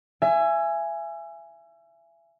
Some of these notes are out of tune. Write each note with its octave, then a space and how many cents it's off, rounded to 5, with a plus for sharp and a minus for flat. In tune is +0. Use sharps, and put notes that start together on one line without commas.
E5 +30 G#5 +0